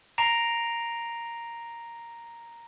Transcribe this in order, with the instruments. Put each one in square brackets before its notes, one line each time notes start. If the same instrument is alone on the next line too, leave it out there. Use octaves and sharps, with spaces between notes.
[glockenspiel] A#5 A#6 C7 D7 F7